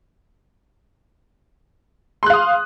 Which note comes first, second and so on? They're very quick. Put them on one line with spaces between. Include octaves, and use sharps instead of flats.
C6 F#6 F5 D#6